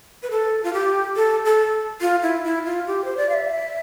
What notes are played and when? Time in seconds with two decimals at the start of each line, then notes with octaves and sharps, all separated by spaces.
0.23 B4
0.31 A4
0.64 F4
0.73 G4
1.16 A4
1.45 A4
2.01 F4
2.23 E4
2.44 E4
2.65 F4
2.87 G4
3.05 C5
3.17 D5
3.29 F5
3.34 E5